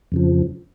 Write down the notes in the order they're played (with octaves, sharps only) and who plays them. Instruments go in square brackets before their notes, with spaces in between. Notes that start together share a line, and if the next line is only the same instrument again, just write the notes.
[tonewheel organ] F2 C#3 F3